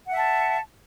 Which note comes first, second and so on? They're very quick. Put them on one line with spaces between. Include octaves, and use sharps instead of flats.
F#5 E5 A5